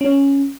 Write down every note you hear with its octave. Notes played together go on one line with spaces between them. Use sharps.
C#4